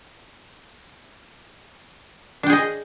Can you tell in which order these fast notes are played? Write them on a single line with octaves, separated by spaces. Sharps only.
D4 G5 G#4 D#5